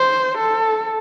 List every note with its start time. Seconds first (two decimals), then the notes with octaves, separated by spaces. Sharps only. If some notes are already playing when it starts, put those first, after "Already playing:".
Already playing: C5
0.38 A4